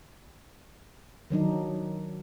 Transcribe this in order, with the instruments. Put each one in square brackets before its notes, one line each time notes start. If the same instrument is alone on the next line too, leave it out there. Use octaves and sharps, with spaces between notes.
[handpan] D#3 F#3 D4 D#4